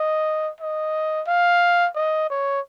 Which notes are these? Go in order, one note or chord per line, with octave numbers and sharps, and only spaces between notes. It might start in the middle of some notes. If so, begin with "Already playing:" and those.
Already playing: D#5
D#5
F5
D#5
C#5